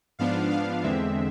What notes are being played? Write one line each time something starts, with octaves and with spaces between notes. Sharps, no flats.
G#2 F3 B3 D4 F5
F5
E2 D3 G#3 C4 E5